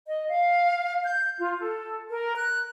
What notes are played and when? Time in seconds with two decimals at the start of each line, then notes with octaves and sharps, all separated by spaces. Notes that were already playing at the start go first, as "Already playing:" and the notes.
0.07 D#5
0.30 F5
1.04 G6
1.38 F4
1.60 A4
2.10 A#4
2.37 F#6